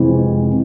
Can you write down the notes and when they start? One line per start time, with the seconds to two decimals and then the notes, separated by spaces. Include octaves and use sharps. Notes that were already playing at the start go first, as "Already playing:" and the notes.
Already playing: F2 C3 E3 G#3 C4